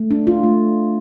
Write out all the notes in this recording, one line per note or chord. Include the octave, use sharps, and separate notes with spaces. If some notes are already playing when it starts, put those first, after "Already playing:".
Already playing: A3
D4
F4
A3